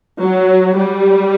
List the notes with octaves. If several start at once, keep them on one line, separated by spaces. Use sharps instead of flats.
F#3
G3